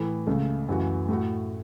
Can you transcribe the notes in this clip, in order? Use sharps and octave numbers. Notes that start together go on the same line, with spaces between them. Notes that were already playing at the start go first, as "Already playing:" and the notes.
Already playing: A2 E3 A3
C#2 C#3 A3
F#2 E3 A3 F#4
A2 A3 F#4